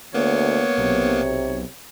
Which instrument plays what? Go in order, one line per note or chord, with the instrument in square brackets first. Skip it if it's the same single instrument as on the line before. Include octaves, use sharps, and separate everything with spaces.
[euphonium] D2 [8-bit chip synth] A#3 B3 [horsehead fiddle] C#5
[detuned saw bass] B1 [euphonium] C3